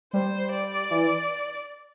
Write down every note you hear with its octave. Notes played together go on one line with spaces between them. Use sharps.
G3 C5
D5
E3